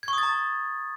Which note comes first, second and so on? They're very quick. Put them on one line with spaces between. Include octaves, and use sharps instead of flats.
G#6 C#6 D#6 A6 A#5